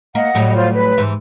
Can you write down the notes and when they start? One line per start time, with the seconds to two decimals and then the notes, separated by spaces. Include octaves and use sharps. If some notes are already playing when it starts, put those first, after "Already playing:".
0.15 A#3 D#5 F#5
0.35 A2 F#3 G3
0.55 F4 C5
0.73 B4
0.98 G#2 E3